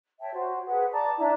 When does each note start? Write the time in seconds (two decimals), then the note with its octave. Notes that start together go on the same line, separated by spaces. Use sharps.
0.21 C#5 E5 G5 A5
0.34 F#4 C5
0.66 G#4 B4 F#5
0.93 D5 A5 A#5 D6
1.20 D4 E4 E5 A#5